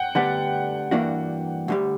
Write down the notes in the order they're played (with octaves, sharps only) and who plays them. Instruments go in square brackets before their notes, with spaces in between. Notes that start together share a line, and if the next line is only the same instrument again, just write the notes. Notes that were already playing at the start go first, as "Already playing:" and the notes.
Already playing: [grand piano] F#5 G5
[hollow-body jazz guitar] D2 D3 G3 B3 D4 [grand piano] F#5
[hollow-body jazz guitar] G2 E3 A#3 D4 F#4
D2 D3 G3